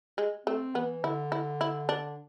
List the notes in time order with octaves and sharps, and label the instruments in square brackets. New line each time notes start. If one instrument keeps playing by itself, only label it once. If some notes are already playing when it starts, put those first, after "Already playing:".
[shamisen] G#3
[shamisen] A3 [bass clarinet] C4
[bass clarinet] E3 [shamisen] B3
[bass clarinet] D3 [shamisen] E4
[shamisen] E4
E4
D4